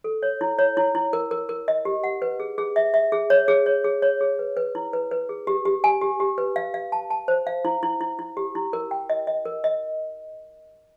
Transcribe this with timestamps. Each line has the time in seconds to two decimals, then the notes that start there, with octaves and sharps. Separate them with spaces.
0.04 A4
0.23 C#5
0.41 E4
0.59 C#5
0.77 E4
0.95 E4
1.13 A#4
1.31 A#4
1.49 A#4
1.68 D#5
1.85 G4
2.04 F#5
2.22 B4
2.40 G#4
2.58 G#4
2.76 E5
2.94 E5
3.12 G#4
3.30 C#5
3.48 G#4
3.66 C#5
3.84 G#4
4.02 C#5
4.21 G#4
4.39 B4
4.57 B4
4.75 E4
4.93 B4
5.11 B4
5.29 G#4
5.47 G4
5.65 G4
5.84 G#5
6.01 G4
6.20 G4
6.38 B4
6.56 F5
6.74 F5
6.92 A5
7.10 A5
7.28 C5
7.47 F5
7.65 E4
7.83 E4
8.01 E4
8.19 E4
8.37 G4
8.55 E4
8.73 A#4
8.91 G5
9.10 D#5
9.27 D#5
9.45 A#4
9.64 D#5